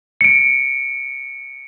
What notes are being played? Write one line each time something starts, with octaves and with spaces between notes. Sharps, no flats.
C#7 D7